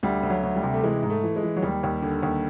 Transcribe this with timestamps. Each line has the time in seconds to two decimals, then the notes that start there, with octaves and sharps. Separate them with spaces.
0.03 D2 G3
0.23 D2
0.30 F#3
0.43 D2
0.56 G3
0.63 C3
0.74 A3
0.84 E3 G#3
1.03 G#2
1.10 A3
1.23 E3
1.36 G#3
1.43 E3
1.56 F#3
1.62 D#2 G3
1.83 D#2
2.02 D3
2.23 D#2